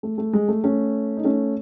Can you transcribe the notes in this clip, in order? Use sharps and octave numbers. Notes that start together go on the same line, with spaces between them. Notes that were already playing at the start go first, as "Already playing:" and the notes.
A3
A3
G#3
A3
A3 C#4
D#4
A3 C#4